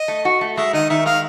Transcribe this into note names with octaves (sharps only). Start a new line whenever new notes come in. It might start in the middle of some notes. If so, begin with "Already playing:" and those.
Already playing: D#5
A3
F#4
A3
G#3 E5
D#3 D#5
D#3 E5
G#3 F5